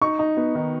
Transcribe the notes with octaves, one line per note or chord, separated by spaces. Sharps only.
D#4 C#6
D#4
B3
D#3